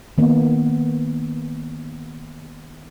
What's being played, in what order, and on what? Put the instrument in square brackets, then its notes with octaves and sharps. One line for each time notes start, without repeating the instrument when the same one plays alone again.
[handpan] D#3 A#3 B3